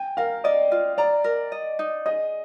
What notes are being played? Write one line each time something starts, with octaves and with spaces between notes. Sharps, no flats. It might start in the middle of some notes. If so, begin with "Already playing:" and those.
Already playing: G5 G#5
A#4 F5
D5 D#5
F4
D5 A#5
A#4
D#5
D#4
G#4 D#5